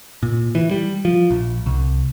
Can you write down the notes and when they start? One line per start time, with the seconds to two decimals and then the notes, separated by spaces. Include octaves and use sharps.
0.23 A#2
0.55 E3
0.71 G3
1.05 F3
1.31 A#1
1.66 C2